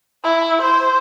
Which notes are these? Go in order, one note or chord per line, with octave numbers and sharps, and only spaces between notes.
E4
C5